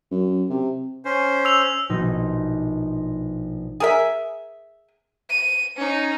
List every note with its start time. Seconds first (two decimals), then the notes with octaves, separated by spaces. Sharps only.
0.11 F#2
0.49 C3
1.05 C#4 C5
1.45 E6 F7
1.90 A#1 B2 F3 D#4
3.80 G#4 A#4 E5
5.30 D#7
5.77 C#4 D#4